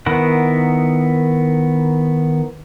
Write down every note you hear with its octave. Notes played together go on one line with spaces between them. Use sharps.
D#3 B3 E4 A#4 F#5